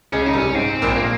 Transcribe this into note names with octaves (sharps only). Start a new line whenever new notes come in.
C#2 C#3 C#4
D#4
C2 C3
C#4
G#2 C4
A#1 A#2
A#3